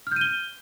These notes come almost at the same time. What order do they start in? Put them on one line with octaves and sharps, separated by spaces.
F6 G6 D#7 G7